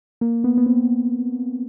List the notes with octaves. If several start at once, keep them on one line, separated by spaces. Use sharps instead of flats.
A#3
B3
B3
C4